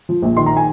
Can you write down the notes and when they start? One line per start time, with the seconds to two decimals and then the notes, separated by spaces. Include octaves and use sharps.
0.09 F3
0.23 A#1
0.37 D#3 C6
0.46 A#5
0.57 G#5